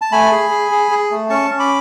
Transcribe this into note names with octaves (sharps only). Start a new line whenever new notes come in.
A5
A3 G#5 B5
G#4
G#4
G#4
G#4
A3
C#4 A5 C#6
C#4
B5 D6